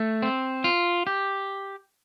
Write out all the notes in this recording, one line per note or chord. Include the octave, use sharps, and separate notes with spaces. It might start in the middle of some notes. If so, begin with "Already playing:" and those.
Already playing: A3
C4
F4
G4